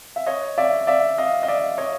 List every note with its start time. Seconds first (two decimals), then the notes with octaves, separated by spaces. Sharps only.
0.16 E5
0.26 C#5 D#5
0.58 D5 E5
0.87 D5 E5
1.18 D#5 F5
1.43 D#5
1.48 D5 E5
1.78 C#5 D#5